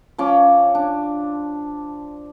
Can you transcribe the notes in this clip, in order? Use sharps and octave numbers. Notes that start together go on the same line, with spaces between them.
F3 C#4 D6
D4